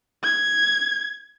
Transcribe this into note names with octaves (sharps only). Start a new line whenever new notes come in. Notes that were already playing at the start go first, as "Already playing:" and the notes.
G#6